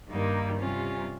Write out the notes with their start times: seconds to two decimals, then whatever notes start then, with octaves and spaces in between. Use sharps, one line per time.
0.09 G2 D#3 G3 A#3 D#4
0.60 C3 G3 C#4 F4